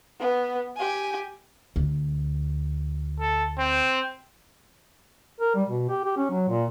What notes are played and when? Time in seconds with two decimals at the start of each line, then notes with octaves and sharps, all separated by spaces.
0.20 B3
0.77 G4 G#5
1.76 D2
3.20 A4
3.59 C4
5.40 A#4
5.55 G3
5.68 B2
5.89 G4
6.05 G4
6.17 C#4
6.31 F#3
6.49 A#2